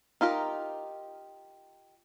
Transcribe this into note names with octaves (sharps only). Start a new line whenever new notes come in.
D#4 F4 G4 A#4